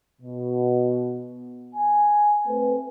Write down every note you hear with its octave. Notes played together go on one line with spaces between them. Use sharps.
B2
G#5
A3 C4 B4